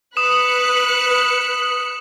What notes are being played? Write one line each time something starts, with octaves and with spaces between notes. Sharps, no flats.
B4 D#6 F#6 C#7 E7